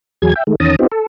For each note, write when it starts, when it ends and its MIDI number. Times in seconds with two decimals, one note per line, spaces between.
0.22 0.34 40
0.22 0.34 54
0.22 0.34 68
0.22 0.34 92
0.35 0.43 76
0.35 0.43 79
0.47 0.55 51
0.47 0.55 56
0.47 0.55 57
0.60 0.76 40
0.60 0.76 51
0.60 0.76 61
0.60 0.76 81
0.60 0.76 82
0.60 0.76 87
0.79 0.87 59
0.79 0.87 60
0.79 0.87 63
0.79 0.87 65
0.79 0.87 67
0.92 1.06 69